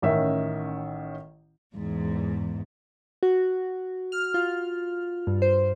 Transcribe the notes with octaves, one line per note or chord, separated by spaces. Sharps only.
A1 D#3 C#4 E5
E2 G#2
F#4
F6
F4
G2
C5